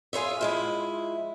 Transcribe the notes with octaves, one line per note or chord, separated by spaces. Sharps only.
F4 G#4 C5 C#5 E5
F3 G#3 E4